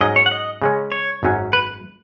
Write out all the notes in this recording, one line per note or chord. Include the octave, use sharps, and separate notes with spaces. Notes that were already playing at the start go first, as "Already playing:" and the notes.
G#2 F#3 C#4 D#5
C#5
F#5
D#5
C#3 G#3 C#4
C#5
G#1 F#2 F#3 C#4
B4